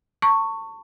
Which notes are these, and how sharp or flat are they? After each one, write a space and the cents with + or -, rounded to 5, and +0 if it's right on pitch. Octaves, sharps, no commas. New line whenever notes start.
A5 +35 C#6 +0